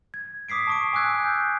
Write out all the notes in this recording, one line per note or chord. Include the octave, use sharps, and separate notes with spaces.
G#6
D6 D#6 B6 C7 D7
A5 C#6 D7
G#5 D6 E6 F#6 G#6
G6